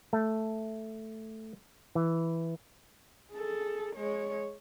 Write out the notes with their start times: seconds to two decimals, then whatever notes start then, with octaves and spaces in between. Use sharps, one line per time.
0.13 A3
1.95 E3
3.33 G#4 A4
3.96 G#3 C#5